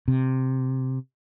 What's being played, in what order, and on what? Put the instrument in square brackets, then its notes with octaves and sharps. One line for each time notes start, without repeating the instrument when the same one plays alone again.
[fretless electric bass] C3